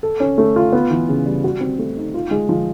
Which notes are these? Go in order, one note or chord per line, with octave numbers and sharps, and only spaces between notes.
A4
C#4
A3
F4
B3
E3
C#3
G3
F#4
C4
A3
D#4
F4
G#3
F3